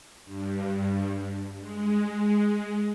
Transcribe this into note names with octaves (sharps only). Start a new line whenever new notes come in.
G2
G#3